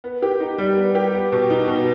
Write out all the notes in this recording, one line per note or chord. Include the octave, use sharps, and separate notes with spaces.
B3
G4
D#4
G3
B3
G4
B3
B2
D#4
B2